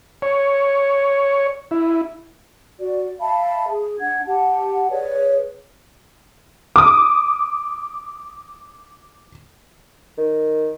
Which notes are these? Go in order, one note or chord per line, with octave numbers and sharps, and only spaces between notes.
C#5
E4
F#4 D5
E5 F5 A5 B5
G#4
D4 F#5 G#6
G4 F#5 A5
G#4 B4 C#5 D5
D6 D#6
D#3